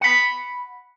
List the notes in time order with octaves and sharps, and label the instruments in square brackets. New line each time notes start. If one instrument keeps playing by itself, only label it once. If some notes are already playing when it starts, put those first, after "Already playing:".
[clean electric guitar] F#5 B5